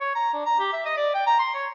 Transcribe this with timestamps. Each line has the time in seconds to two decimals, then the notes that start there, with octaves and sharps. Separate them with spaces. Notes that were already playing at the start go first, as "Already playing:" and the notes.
0.01 C#5
0.15 A#5
0.33 D4
0.46 A#5
0.59 G4
0.73 E5
0.85 D#5
0.97 D5
1.14 G5
1.27 A#5
1.39 C6
1.54 C#5